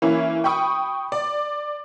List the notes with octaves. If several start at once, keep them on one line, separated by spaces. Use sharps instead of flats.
E3 A#3 C#4 E4
G5 B5 C#6 D#6
D5